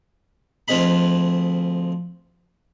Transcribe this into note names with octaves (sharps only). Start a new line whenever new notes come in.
D2 F3 C4 G#4 D#5 B5